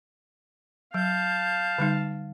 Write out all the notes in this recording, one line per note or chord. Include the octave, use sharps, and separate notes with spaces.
F#3 F5 A5 G6
D3 G3 D#4